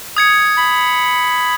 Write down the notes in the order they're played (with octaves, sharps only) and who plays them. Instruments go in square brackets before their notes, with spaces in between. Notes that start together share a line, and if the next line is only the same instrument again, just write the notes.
[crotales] D#6 G#6 C#7
[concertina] B5